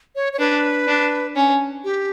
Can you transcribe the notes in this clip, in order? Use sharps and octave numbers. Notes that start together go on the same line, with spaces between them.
C#5
C#5
D4 B4
D4
C#4
G4